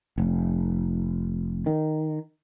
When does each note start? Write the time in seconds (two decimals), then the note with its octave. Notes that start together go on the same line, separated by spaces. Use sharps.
0.18 F1
1.66 D#3